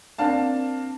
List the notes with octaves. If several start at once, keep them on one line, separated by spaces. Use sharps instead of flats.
A#3 C4 D4 F5 A5